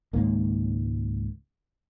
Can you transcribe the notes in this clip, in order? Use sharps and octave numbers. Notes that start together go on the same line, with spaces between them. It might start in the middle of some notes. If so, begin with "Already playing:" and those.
C#2 G#2 D#3 A#3